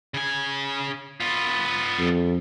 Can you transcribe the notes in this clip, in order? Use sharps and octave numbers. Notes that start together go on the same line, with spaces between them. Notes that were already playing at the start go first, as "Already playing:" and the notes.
C#3 G#5
B3 F4
F2